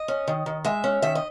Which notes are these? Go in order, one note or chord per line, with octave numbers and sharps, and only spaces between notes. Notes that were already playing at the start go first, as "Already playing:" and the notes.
Already playing: D#5
C#4
D#3
D#3
G#3 E5
C#4
D#3 E5
D#5